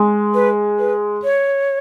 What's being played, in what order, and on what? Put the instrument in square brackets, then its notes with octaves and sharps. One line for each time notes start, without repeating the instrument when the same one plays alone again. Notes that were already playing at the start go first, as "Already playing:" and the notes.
Already playing: [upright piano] G#3
[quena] B4
B4
C#5